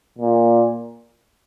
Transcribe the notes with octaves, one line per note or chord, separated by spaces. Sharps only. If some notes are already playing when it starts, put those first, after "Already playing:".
A#2